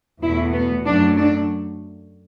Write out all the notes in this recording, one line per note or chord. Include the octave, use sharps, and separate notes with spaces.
E2 B2 A3 E4
B3
F#2 F#3 A3 D4
D4